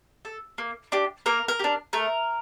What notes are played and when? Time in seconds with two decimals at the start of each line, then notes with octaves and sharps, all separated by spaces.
0.25 A4
0.58 A#3
0.92 D4 G4
1.26 A#3 A#4
1.48 A#4
1.59 G4
1.64 D4
1.93 A3 A#4